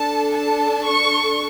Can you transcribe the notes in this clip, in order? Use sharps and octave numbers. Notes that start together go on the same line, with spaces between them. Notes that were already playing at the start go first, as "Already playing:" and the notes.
Already playing: D4 A4 A5
A5
C#6